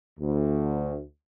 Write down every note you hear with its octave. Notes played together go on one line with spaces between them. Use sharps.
D2